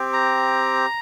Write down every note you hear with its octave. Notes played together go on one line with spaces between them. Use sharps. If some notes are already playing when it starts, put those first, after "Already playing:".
Already playing: C4 G4
A#5